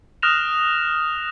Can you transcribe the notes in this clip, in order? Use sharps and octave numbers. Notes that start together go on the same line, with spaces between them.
D#6 F6 F#6 A#6 E7 F7